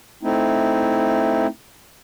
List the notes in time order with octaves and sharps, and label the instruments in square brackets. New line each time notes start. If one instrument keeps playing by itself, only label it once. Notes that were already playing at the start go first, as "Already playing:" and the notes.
[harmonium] A3 C4 D#4 E4